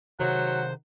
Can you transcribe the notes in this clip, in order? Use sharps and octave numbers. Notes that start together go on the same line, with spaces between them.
C3 D#3 F#3 C5 F#5